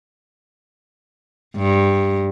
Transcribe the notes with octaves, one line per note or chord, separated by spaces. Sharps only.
G2